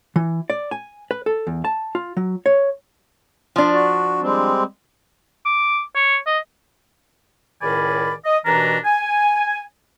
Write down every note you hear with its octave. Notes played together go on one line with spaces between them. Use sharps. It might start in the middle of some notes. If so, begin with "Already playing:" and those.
E3
D5
G#5
B4
A4
E2
A5
F4
F#3
C#5
F3 D4
F#4
G3 G#3 C4
D6
C#5
D#5
C#2 A2 D#3 D5 G#5 B5
D#5
D#2 B2 E3 D4 A#5
G#5